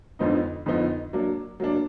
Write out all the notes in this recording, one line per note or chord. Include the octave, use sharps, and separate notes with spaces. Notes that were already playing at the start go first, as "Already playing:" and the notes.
F2 D3 F3 B3 D#4
F2 D3 F3 B3 D#4
F#3 A#3 D4
F#3 A#3 D4